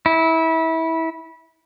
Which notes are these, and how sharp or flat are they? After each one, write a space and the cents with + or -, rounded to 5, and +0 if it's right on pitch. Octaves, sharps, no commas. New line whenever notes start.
E4 -25